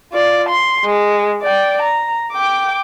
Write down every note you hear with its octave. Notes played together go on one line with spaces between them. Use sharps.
F4 D5
C6
G#3
D5 G5
A#5
G5 D6